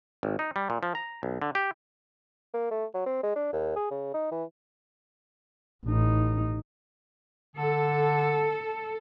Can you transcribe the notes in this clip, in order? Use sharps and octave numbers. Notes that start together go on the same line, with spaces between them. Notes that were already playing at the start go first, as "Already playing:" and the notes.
G#1
D#4
G3
A#2
F3
A#5
B1
D3
G4
A#3
A3
F#3
C4
G#3
D4
D#2
G#4
C#3
D#4
E3
A1 D#4
D3 A4